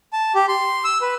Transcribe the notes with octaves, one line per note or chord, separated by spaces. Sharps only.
A5
G4
C6
E6
B4